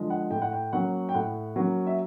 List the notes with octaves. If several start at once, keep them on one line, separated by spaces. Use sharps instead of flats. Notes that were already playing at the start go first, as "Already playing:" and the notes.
Already playing: D3 F3 G#3
F#5
A2 G5
F#5
G5
F#3 A#3 C#4 F#5
G5
A2 F#5
F#3 A#3 C#4
E5